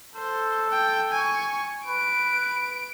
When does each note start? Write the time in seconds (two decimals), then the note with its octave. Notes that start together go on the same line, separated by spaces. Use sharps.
0.16 A4 C5
0.70 G5
1.12 G#5 C#6
1.87 B4 D7